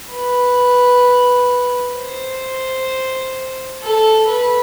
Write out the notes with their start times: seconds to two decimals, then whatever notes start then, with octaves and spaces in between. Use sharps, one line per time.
0.12 B4
1.97 C5
3.82 A4
4.28 B4